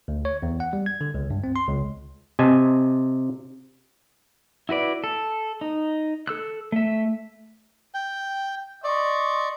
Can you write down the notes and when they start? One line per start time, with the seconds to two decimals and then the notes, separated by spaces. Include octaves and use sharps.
0.08 D2
0.25 C#5
0.42 E2
0.60 F#5
0.73 G3
0.86 G#6
1.01 D3
1.14 C#2
1.30 G2
1.44 C4
1.56 C6
1.67 C#2
2.39 C3 D#5 G#5 A5
4.69 E4 F#4 B4 D5
5.04 A4
5.61 D#4
6.28 A4 E6 F#6
6.72 A3 E5
7.94 G5
8.84 D5 D#5 C6 C#6